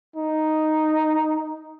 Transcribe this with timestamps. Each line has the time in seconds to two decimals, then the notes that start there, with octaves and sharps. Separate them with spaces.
0.16 D#4